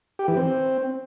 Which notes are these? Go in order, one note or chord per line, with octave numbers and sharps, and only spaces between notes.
G4
E3
C4